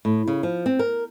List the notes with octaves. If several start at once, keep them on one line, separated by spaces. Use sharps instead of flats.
A2
C#3
F3
C4
A#4